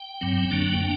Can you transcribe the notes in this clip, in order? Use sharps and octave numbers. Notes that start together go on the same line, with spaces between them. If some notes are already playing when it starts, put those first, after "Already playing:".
Already playing: G5
G2 F#3 C4
F#2 D3 F#3 A#3 D4
A#3 D4